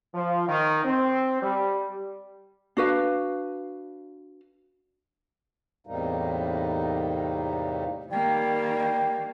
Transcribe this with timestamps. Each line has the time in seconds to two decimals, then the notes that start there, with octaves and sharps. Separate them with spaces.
0.14 F3
0.47 D#3
0.84 C4
1.42 G3
2.77 D4 F#4 B4 F5
5.87 E2 A2 C3 G3 A#3 D#4
8.10 D#3 G3 A#3 G5